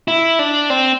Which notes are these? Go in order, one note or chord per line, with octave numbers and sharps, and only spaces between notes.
E4
D4
C4